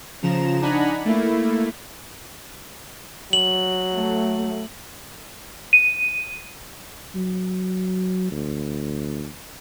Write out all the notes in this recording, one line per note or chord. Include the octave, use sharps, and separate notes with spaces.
C#3 F3 A#5 E7
D4 D#4 F#5 G#5 A#5 B5
A3 A#3 E4
F#3 F#7
A3
D#7
F#3
D2